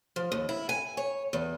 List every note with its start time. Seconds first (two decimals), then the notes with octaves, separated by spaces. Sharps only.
0.16 F3
0.32 D#2
0.49 E4
0.69 G#5
0.97 C#5
1.33 E2